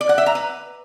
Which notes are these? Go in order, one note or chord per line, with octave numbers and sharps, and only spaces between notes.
D5
F#5
E5
A#5
B4